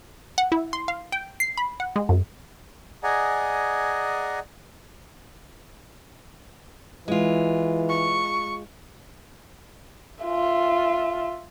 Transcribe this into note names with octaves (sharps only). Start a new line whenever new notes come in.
F#5
E4
C6
F5
G5
C7
B5
F#5
G#3
F#2
G#4 D5 D#5 F#5 G#5 A#5
E3 G#3 F4
C#6
F4 E5